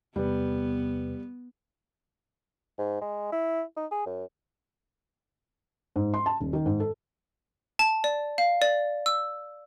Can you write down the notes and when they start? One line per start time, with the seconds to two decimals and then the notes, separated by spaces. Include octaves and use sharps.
0.16 E2 C3 G3 B3 B4
2.78 G#2
3.01 G#3
3.32 E4
3.77 D#4
3.91 G#4
4.06 F#2
5.96 G#2
6.14 C6
6.26 A5
6.40 D#1
6.53 D#3
6.66 G#2
6.80 A4
7.79 A5
8.04 D5
8.38 F5
8.62 D5
9.06 E6